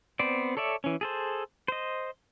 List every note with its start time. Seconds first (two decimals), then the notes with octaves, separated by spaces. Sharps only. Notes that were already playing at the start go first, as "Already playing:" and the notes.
0.19 B3 C4 C5 D5
0.57 A4 C#5 D5 E5
0.84 E3 C#4
1.01 G#4 A4 C5
1.68 C5 D#5